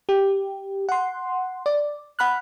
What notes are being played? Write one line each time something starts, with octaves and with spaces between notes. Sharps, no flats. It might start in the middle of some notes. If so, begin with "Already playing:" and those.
G4
F#5 C6
D5
F#5 B5 F6 F#6